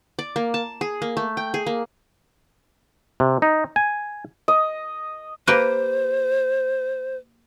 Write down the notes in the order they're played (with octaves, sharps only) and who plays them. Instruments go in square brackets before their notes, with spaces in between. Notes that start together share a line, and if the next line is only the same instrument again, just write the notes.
[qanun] D5
A#3
A5
G#4
A#3
A3
G5
G#4
A#3
[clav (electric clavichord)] C3
D#4
G#5
[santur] D#5
[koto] A#3 G4 B4 [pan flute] C5